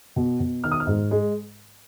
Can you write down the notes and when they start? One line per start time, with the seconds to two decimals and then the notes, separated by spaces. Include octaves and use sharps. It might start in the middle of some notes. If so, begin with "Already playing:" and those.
0.16 B2
0.40 B2
0.64 D#3 F6
0.72 D#6
0.80 F6
0.87 G#2
1.11 G#3